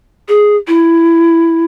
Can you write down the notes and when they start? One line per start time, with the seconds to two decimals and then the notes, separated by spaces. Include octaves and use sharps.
0.29 G#4
0.68 E4